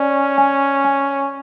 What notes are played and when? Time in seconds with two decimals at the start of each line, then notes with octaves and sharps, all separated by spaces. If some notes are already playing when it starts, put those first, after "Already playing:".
Already playing: C#4 D5
0.38 G#5
0.84 G#5